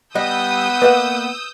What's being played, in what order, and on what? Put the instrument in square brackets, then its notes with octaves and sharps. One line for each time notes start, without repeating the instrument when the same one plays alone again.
[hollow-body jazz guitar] G3 D#5 [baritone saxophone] B3 [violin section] D#6 E6 G6
[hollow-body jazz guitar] A#3 D#5 F#5 [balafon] B4